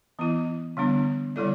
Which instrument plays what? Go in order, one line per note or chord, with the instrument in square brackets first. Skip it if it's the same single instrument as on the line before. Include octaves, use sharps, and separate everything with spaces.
[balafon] E3 B3 E4
D3 G3 B3 D4
D3 G3 E4 A4 D5